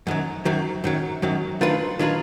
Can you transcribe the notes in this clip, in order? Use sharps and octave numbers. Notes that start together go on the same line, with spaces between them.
F#2 D#3 F#3
F#2 D#3 F#3
F#2 D#3 F#3
F#2 D#3 F#3
D#3 F#3 D4 F4 B4
D#3 F#3 D4 F4 B4